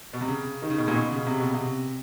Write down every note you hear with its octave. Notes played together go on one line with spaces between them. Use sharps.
B2
C3
C#3
D#3
C#3
B2
A#2
B2
C#3
C3
B2
C3